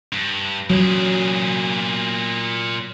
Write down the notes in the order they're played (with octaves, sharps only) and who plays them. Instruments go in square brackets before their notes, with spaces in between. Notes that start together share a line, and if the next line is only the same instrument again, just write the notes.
[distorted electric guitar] G2
[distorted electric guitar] A#2 G#4 [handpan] F#3